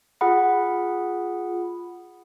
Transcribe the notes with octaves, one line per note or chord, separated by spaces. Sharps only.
F4 G#4 F#5 B5